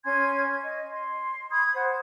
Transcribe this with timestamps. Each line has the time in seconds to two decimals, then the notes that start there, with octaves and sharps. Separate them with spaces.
0.04 C#4 G#5 C6 G#6
0.62 D#5
0.92 C6
1.51 B5 D#6 G#6
1.75 C5 F#5